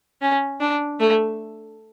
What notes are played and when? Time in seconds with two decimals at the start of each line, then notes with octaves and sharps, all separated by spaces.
0.22 C#4
0.60 D4
1.00 A3